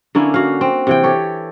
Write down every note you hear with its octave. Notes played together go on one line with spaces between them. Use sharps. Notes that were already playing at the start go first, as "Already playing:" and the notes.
D3 A#3 C#4 E4
F#4 F5
C4
C3 E3 G5
G4 A4 C#5